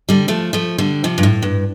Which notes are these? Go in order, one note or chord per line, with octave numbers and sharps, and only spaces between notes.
D3 G3
F3 A3
F3 A3
D3 G3
C3 F3
G2
A2
G2